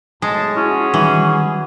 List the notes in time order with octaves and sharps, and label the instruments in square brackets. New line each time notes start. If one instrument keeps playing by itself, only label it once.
[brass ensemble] B1 A2 A5 [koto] G#3
[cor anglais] C#4 [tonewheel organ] E4 [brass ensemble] F#4 G#4
[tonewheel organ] D#3 G3 [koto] E3